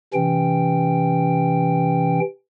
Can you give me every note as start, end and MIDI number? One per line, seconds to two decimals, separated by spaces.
0.14 2.20 48
0.14 2.20 52
0.14 2.20 61
0.14 2.20 79